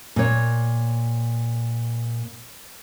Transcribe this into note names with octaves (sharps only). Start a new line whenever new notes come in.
A#2 C#5